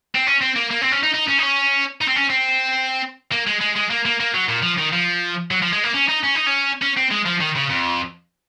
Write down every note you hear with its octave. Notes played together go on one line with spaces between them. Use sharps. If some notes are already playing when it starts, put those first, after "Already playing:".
C4
C#4
C4
A#3
A#3
C4
C#4
D#4
D#4
C#4
D#4
C#4
D#4
C4
C#4
C4
A#3
G#3
G#3
G#3
A#3
A#3
A#3
F#3
A#2
F3
D#3
F3
F#3
F3
G#3
A#3
C#4
D#4
C#4
D#4
C#4
C#4
C4
G#3
F3
D#3
C#3
F2